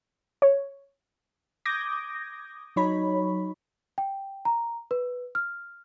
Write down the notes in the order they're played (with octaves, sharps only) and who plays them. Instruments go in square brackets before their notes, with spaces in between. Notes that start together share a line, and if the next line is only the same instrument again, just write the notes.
[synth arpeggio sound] C#5
[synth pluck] D6 D#6 G6 G#6 A#6
F#3 D#4 C#5 B5
[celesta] G5
A#5
B4
F6